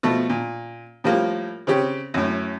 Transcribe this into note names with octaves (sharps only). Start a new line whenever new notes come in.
B2 F3 A3
A#2
A2 F3 G3 A#3
C#3 C4 C#4 G4
F#2 A2